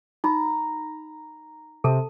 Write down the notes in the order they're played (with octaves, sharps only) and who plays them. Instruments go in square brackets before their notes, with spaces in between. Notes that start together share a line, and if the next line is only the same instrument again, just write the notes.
[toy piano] D#4 B5 [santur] A#5
[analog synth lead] C3 [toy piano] A4 A5